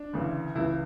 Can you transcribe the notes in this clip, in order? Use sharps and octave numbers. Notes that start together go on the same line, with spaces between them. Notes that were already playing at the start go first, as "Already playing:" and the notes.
Already playing: D4
D2 C#3 E3
C#2 C#3 E3 E4